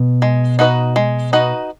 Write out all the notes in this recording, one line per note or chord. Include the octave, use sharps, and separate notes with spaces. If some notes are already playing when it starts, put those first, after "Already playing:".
Already playing: B2
G#3
D#4 F#4 B4 D#5
G#3
D#4 F#4 B4 D#5